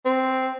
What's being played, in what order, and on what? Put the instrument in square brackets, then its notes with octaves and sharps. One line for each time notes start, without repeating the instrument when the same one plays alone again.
[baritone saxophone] C4